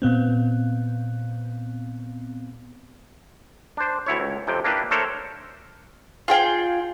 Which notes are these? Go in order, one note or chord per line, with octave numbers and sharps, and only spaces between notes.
A#2 B3 C4
D4 C5
D2 E4 C#5
C#2
F2 C3 G5
A#3 D4 E4 G4 B4
A3 D4 A4 A#4 C5 C#5
F4 G#4 G5